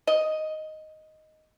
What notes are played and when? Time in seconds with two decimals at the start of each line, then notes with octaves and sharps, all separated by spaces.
0.07 D#5